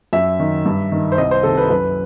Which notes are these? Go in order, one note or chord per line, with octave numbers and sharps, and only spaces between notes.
F#2 E5
D#3
G2
D#3
C5
C2 D#5
C5
C3 D#3 A4
B4
F#2 B4